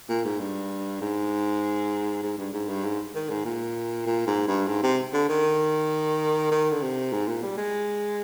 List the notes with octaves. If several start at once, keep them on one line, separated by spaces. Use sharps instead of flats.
A#2
G#2
G2
G#2
G#2
G2
G#2
G2
G#2
D#3
G#2
A#2
A#2
G#2
G2
G#2
C3
D3
D#3
D#3
D3
C3
G#2
A#2
G3
G#3